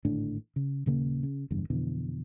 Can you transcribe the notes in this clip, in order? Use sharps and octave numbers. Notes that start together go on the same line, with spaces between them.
G#1 A2 D3 D4
C#3
D#1 C#3 A#3
C#3
F#1 E2 G2
F2 B2 D3 E3